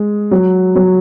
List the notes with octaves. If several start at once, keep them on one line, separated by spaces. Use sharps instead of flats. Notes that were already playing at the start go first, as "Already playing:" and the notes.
Already playing: G#3
F#3
F#3